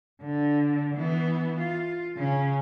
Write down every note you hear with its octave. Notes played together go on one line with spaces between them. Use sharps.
D3
E3 B3
F4
C#3 C#4